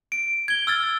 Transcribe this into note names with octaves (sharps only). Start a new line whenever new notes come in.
D7
G#6 G7
E6 F6 A6